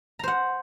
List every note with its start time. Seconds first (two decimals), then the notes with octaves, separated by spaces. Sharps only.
0.19 A#5
0.23 C5
0.28 F#5